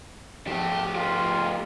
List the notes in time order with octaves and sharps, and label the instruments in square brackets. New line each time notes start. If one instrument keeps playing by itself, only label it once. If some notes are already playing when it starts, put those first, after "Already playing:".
[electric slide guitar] F3 B3 [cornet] A3 [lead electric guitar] G4
[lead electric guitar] A3 G4 [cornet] F4